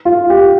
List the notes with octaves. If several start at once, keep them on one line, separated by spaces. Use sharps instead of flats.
F4
G4